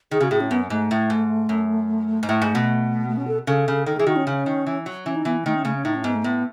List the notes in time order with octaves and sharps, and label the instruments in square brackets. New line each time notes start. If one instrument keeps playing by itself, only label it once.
[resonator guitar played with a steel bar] D#3 [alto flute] G#4
[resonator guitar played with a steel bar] C#3 [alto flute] F#4
[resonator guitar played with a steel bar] A2 [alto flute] G#4
[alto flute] C#4
[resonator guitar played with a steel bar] F#2 [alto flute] B3
[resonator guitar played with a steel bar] G#2 [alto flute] A3
[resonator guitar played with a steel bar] A2
G#2
F#2
G#2
[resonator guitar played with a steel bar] A2 [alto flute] A3
[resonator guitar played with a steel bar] G#2
B2
[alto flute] A3
C#4
A4
[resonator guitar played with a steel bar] C#3 [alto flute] A4
[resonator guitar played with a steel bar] C#3
[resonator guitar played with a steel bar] D#3 [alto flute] A4
[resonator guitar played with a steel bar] E3 [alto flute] G#4
[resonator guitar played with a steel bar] D#3 [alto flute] F#4
[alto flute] C#4
[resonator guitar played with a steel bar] C#3
D#3
E3
F#3
[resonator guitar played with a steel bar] E3 [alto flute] C#4
[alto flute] D#4
[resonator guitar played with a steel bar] E3 [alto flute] B3
[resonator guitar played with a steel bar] D#3 [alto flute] A3
[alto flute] C#4
[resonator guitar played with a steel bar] C#3 [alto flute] A3
[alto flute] C#4
[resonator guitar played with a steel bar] A2 [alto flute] D#4
[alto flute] C#4
[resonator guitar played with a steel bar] G#2 [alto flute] B3
[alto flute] A3
[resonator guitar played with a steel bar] A2 [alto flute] B3